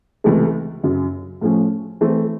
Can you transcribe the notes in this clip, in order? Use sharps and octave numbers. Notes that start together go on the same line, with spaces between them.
C#2 C3 E3 A3
F#2 C#3 F#3
A2 F3 A3 C#4
E3 A3 C4